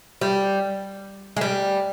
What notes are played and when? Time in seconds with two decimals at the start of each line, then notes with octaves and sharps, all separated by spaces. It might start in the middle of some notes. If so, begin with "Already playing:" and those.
0.21 G3
1.37 G#3
1.41 G3